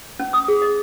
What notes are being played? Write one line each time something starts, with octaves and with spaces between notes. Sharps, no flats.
C#4
D#6
G#4
D#5